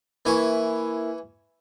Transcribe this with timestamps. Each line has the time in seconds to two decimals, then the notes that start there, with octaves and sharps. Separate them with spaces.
0.25 E3 A#3 E4 G#5 C#6